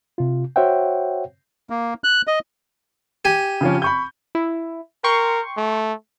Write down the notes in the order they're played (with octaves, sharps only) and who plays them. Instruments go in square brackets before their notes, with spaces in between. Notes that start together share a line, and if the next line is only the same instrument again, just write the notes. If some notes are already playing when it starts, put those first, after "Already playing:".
[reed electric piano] C3 F4
F#4 C5 C#5 E5 F#5 G5
[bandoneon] A#3
F#6
D#5
[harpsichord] G4 G#5
[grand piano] C#3 F3 C#4
B5 C#6 G6
[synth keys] E4
[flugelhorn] A#4 [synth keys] G5 C6 C#6
[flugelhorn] A3